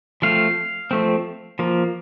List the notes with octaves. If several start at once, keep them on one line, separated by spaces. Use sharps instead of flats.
F3 A3 C4 F5
F3 A3 C4
F3 A#3